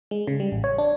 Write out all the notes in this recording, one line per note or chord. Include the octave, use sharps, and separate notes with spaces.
G#3
C#3
G3
A1
C#5
D4